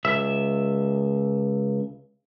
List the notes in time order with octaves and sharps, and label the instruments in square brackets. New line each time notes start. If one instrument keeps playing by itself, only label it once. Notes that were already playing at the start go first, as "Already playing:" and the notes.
[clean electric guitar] C#2 E5